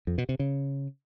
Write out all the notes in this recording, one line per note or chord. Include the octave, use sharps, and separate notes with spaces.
F2
B2
C3
C#3